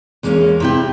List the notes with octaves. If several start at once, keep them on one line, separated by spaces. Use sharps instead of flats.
E2 G#3 A#3 C#4 F5
C3 E4 G5